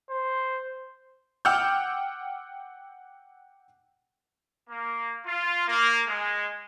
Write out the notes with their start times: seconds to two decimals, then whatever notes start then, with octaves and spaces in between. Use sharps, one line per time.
0.10 C5
1.45 F#5 G5 D6 E6 F6 G6
4.70 A#3
5.27 F4
5.68 A#3
6.08 G#3